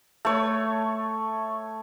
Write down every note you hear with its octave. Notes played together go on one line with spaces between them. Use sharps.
A3 C#5